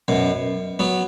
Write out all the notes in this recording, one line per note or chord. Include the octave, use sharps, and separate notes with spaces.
F#2 B2
F#3 B3